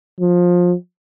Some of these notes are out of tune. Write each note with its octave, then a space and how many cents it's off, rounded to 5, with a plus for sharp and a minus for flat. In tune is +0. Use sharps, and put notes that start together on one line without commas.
F3 +20